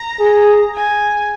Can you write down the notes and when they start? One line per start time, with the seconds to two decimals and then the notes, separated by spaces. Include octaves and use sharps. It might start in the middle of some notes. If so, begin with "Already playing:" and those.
Already playing: A#5
0.19 G#4
0.74 G#5